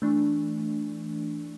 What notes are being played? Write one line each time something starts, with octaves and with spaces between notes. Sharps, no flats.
E3 A3 D4